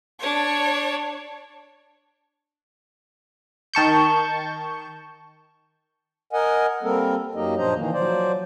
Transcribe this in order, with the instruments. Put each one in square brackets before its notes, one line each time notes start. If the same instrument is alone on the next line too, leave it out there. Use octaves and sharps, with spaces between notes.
[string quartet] D4 C#5
[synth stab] D#3 A5 C#6 G6
[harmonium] A#4 D#5 F#5 G#5
G3 A#3 C4 A4 A#4
F#2 F#3 A#3 D#4 G4 D#5
A#2 F3 D4 C5 D#5 A#5
D#3 E3 A#3
F3 F#3 C5 D5